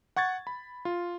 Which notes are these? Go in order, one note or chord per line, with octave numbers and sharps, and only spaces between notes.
F#5 C#6 G#6 A6
B5
F4